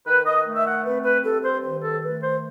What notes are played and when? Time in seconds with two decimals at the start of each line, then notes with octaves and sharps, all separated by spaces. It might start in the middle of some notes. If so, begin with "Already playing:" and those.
0.07 D#3 B4
0.26 D#5
0.46 A3
0.55 E5
0.66 F#5
0.85 C4 B4
1.04 B4
1.23 G2 A4
1.43 C5
1.63 D#3 C5
1.82 A4
2.02 A3 B4
2.21 C5